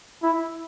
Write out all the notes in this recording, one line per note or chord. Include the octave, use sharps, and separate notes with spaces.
E4